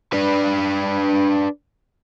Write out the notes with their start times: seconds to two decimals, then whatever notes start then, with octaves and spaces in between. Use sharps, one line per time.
0.13 D4 B4